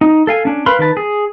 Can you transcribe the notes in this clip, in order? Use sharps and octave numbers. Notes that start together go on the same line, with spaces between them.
D#4
A4 F5 G#5
C#4 D4
A#4 B4 F5 B5 C6
D#3 B4 A5
G#4